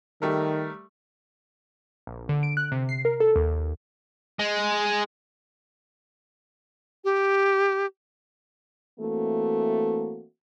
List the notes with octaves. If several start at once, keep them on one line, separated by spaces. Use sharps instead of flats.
D#3 G3 A3 A#4
A#1
D3
D7
F#6
C3
C7
A#4
A4
D#2
G#3
G4
E3 A3 A#3 C4 F#4